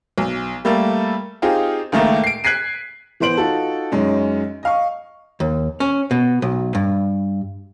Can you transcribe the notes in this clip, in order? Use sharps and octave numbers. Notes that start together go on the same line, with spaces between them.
B1
G3 A3 A#3 A4
C4 D#4 F4 G4 G#4
C#2 D#3 A3 A#3
C7 D7
F#6 G#6 B6 C7 D#7
E3 B3 C5 D7 F#7
D#4 F4 F#4 A4
F#2 G#3 C#4 D#4
D#5 F5 C#6
D#2
C#4
B2
B1
G2